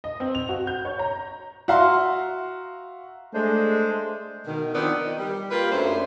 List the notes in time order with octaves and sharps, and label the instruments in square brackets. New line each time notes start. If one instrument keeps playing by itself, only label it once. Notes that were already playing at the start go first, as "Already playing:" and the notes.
[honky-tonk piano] D#5
C4
F7
F#4
G6
C#5
A#5
[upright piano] F#4 E5 F5 A#5 C6
[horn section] G#3 [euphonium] A3 [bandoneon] D4 C5
[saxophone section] B2 D#3
D#3 F3 B3 C4 D4 D5
D#3
G3
A#3 F4 G4 A#4 B4
F#2 F#3 A3 D4 C5